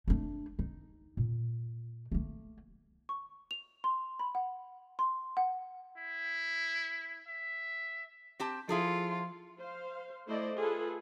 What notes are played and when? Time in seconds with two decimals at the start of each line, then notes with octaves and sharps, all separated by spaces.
0.08 A3 D4
0.59 D#4
1.17 A#2
2.12 A3 A#3
3.09 C#6
3.51 F7
3.84 C6
4.19 B5
4.35 F#5
4.99 C6
5.37 F#5
5.97 E4
7.28 E5
8.39 C4 G4 A5
8.69 F3 E4 F4 G#4 A4
9.60 C5 F5
10.26 A3 E4 C5 D5 D#5
10.56 F4 G#4 A4 B4